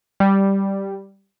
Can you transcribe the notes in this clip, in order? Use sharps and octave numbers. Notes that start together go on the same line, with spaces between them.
G3